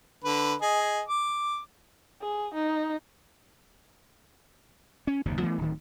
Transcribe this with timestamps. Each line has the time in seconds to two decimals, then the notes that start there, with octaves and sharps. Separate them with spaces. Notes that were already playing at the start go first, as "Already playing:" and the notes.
0.24 D3 B4
0.62 G#4 D#5
1.08 D6
2.21 G#4
2.54 D#4
5.07 C#4
5.25 F#1 D#2 C3
5.40 E3 F3 A3 B3
5.58 D1 D#3